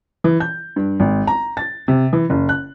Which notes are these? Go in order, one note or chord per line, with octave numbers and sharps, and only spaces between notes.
E3
G6
G2
G#1
A#5
A6
C3
E3
F#1
F#6